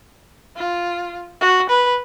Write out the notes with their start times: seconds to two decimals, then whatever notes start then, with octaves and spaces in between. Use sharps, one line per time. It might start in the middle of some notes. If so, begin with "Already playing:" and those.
0.57 F4
1.41 F#4
1.69 B4